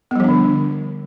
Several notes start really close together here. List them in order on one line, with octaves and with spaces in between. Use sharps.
B3 G3 F3 D4 D3